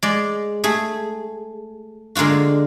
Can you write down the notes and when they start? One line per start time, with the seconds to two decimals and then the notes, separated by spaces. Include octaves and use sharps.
0.03 G#3 D5
0.64 A3 G#4
2.15 D3 G#3 A#3 F4 F#4